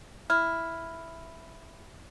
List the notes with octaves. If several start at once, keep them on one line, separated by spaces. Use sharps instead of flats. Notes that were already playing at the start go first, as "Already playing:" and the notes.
E4 F6